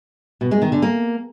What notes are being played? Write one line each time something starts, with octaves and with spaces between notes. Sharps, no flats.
B2
G#3
D#3
D3
A#3